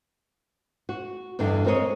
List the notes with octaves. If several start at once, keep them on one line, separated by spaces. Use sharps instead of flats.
F#4
E2 G2 D3 D4 F#4 D#5
G#3 C4 A#4 B4 C#5 D#5